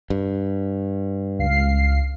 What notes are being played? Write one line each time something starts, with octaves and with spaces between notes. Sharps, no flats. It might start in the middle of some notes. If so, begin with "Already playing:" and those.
G2
C#2 F5 C7